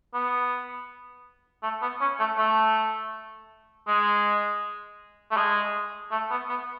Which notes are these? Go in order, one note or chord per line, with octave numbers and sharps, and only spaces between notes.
B3
A3
B3
C#4
A3
A3
G#3
A3
G#3
A3
B3
B3